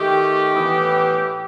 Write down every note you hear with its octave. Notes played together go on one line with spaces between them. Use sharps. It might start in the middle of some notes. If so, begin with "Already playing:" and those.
Already playing: D#3 A3 G4
A2 E3 B3